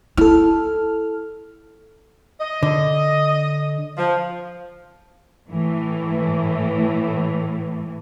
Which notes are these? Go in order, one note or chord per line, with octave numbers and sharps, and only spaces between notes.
E4 A4 F6
D#5
D3
F3
A2 E3